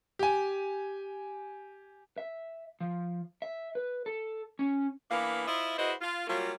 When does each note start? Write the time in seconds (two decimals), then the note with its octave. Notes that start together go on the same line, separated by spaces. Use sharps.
0.19 G4 G#5
2.18 E5
2.81 F3
3.42 E5
3.75 B4
4.06 A4
4.59 C#4
5.11 E3 A#3 B3 D4 F5
5.47 E4 F4 C5 D#5 E5
5.78 E4 F#4 G#4 B4 C5 D#5
6.01 F4
6.27 F#3 G3 A#3 F4